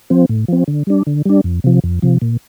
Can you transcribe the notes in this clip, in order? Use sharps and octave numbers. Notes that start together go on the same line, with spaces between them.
F3 C4
A2
F3 C4
D3
G3 D4
D3
G3 D4
F2
C3 F3
F2
C3 F3
A#2